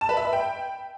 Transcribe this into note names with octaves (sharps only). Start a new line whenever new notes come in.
A5
B4
E5
B5
G5